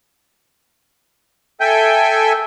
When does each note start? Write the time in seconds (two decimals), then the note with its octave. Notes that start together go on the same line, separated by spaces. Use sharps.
1.61 A4 E5 G5 G#5 G6